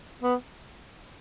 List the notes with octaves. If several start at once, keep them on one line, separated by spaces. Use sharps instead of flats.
B3